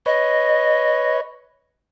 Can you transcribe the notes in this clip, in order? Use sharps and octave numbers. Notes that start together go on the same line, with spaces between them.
B4 C#5 D#5